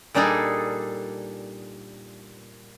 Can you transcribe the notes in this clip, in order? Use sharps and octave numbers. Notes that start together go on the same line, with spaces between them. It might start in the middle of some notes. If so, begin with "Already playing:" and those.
A#2 G3 D4 D#4 G#4 A4